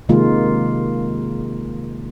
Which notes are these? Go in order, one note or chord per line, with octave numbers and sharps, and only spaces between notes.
C3 D#3 G#3 A#3 F4